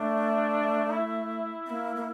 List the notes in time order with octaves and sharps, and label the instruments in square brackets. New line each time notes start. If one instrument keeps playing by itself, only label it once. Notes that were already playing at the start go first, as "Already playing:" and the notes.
Already playing: [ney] A3 [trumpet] D4
[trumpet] E4
[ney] C4
A#3
A#3